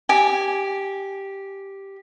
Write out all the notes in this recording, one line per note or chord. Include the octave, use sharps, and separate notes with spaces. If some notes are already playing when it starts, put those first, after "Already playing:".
G4 G#5